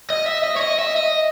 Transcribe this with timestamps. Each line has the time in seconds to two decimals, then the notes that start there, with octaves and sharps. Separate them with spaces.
0.10 D#5
0.26 E5
0.44 D#5
0.57 C#5
0.61 D#5
0.79 E5
0.96 D#5